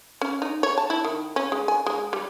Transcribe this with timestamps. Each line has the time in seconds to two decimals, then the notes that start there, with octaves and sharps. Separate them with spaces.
0.21 C#4
0.42 D#4
0.63 C#5
0.78 A5
0.90 E4
1.05 D#3
1.36 C#4
1.52 G#3
1.68 G#5
1.86 G#3
2.13 G3